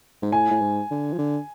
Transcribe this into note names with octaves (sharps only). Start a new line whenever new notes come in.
G#2
A2 G#5
A2
G#2
D3
F3
D3